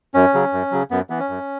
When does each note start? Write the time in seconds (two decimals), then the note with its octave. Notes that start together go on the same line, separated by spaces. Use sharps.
0.14 F#2 C#4
0.34 C#3 F#3
0.53 F#2
0.72 C#3 F#3
0.91 F#2 B3
1.10 E3 B3
1.20 C#4
1.29 F#2